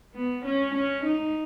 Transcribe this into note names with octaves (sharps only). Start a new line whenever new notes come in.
B3
C#4
C#4
D#4